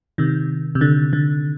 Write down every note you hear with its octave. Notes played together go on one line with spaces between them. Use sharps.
C3 D#3
C3
D3
D3